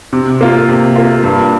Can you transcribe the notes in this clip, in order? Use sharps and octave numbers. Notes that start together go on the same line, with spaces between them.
C3
A#3 F4
C3
A#3 F4
G2